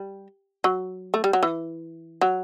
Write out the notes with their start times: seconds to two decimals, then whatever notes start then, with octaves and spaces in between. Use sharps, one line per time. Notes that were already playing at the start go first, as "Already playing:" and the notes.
Already playing: G3
0.64 F#3
1.14 A3
1.24 G3
1.33 F#3
1.43 E3
2.21 F#3